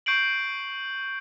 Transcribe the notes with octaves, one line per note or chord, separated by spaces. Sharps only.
C#6 G6 C7 D7 F#7